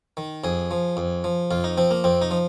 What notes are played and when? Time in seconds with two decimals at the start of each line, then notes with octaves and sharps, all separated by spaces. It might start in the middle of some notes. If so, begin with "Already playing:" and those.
0.17 D#3
0.44 F2 G#4
0.71 F3
0.97 F2
1.24 F3
1.51 F2 F4
1.64 D#4
1.77 F3 C4
1.91 A#3
2.04 F2 C4
2.22 D#4
2.31 F3